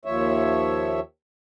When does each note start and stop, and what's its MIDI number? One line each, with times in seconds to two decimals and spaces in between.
0.05 1.00 39
0.05 1.00 53
0.05 1.00 73
0.05 1.00 76